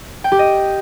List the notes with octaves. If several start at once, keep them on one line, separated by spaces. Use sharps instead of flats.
G5
G4
D#5